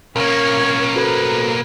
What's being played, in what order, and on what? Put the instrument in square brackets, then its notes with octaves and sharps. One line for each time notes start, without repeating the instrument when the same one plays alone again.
[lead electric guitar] B1 A#3 [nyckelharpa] C#4 C#5 [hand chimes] A#4
[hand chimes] F#4 A4 C5 [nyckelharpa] B4